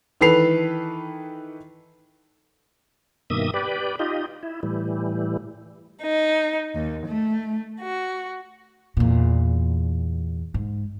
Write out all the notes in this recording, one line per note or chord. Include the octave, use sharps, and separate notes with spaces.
D#3 E3 A4 B4 C7 F7
G2 B2 D#3 A#3 E5 D#6
G4 B4 D5
D#4 F4 G4 D#5
E4
A2 E3 G3
D#4
D#2
A3
F#4
E2 A#2
G#2